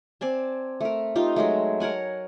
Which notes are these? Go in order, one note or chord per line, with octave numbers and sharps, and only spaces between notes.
C4 D5 G#5 A5
A3 A#4
D#4 F4 G4
F#3 G#3 A3
A#4 C#5 F#5 G#5